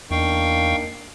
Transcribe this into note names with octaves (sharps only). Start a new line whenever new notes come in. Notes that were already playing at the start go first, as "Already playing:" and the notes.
E2 A#3 D4 D#4 F5 G5 C#6